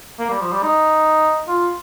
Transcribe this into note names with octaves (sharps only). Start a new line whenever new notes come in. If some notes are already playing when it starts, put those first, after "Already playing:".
A#3
G3
F3
G3
D#4
F4